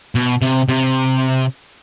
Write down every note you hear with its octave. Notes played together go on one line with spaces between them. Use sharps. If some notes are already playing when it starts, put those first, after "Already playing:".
B2
C3
C3